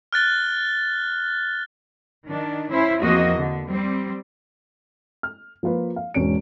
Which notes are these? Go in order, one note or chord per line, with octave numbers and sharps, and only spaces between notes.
F6 F#6 A6 G7
D#3 D4
C#4 E4 C5
E2 F3 A#3 C4 F#4 D#5
D3
G3 C4
F6
F3 A#3 F4 B4
F5
E1 G#2 C#4 D7